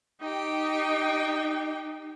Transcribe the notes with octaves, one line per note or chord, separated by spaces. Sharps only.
D#4 G4 G5